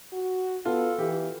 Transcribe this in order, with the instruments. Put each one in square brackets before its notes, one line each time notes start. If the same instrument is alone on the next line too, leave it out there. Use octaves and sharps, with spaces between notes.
[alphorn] F#4
[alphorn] B3 [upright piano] F4 [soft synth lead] A4
[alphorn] E3 [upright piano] G4